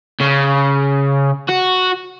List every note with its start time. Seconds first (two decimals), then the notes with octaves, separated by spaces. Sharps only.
0.21 C#3
1.49 F#4